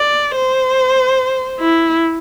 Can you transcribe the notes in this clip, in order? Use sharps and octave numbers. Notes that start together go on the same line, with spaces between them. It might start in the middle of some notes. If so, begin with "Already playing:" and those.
Already playing: D5
C5
E4